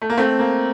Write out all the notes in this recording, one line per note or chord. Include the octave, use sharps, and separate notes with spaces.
A3
A#3
A3 C4
A#3